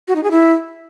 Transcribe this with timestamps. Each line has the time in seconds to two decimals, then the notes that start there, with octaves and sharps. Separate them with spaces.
0.08 F#4
0.16 D#4
0.23 G#4
0.31 E4